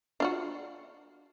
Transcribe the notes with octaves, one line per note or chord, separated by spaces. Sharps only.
D4 F4 F#4